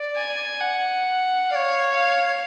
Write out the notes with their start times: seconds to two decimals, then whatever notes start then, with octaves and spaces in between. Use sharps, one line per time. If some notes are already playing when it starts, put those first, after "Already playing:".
Already playing: D5
0.16 G#5
0.60 F#5
1.50 D5 F5
1.55 C#5
1.94 F5